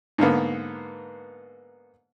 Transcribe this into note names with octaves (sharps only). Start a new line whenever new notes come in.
G#2 D3 A#3 B3